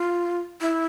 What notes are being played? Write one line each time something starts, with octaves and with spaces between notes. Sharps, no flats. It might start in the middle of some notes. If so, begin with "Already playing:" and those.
Already playing: F4
E4